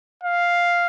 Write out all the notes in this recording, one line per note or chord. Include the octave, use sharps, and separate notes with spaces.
F5